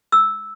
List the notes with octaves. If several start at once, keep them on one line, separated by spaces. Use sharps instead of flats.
E6